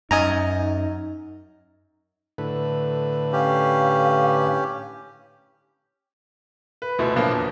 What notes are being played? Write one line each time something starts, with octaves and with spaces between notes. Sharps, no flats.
F#2 D#4 D#5 G#5 A#5
A2 D3 B4
C#4 G4 F5
B4
D2 B2 E4
A#2 D3 F3 F#3 A#3 B3
E2